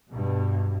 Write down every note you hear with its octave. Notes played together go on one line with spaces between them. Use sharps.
G2 B2